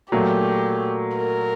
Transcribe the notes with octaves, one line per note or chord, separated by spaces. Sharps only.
A#2 F#3 A3 G4
A#4